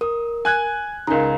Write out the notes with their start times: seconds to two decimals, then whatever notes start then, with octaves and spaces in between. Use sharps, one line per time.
0.01 A#4 D#6
0.45 G#5 F#6 G#6
1.07 C#2 C#3 D#4 A#4 A#5